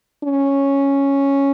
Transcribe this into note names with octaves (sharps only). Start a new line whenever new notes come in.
C#4